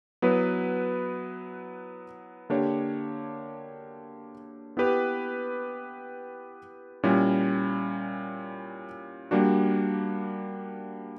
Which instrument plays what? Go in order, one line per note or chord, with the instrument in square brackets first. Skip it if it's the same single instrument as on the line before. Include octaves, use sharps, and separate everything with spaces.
[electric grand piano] F#3 B3 E4 B4
D3 A#3 D4 G4 C#5
B3 E4 G4 B4
A#2 G3 C#4 E4
G3 A#3 D4 F#4